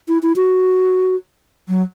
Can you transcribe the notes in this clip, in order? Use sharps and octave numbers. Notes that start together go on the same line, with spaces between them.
E4
E4
F#4
F#3